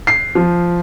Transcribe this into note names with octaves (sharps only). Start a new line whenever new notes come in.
C7
F3